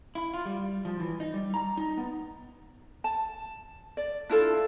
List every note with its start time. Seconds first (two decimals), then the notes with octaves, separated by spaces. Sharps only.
0.15 E4
0.34 F4
0.46 G3
0.85 F3
1.00 E3
1.20 D#4
1.34 G3
1.54 A#5
1.77 D#4
1.98 B3
3.04 A5
3.97 D5
4.29 D4 E4 F4 A4